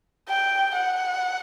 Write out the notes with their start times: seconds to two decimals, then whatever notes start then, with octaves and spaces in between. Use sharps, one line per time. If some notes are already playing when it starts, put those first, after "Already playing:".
0.29 G5
0.76 F#5